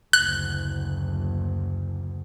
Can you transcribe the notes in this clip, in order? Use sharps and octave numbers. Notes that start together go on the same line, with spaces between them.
F#1 D2 F#6